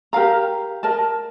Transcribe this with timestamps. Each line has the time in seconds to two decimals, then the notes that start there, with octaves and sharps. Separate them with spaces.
0.13 G4 A#4 F5 A#5
0.83 A#4 D#5 A5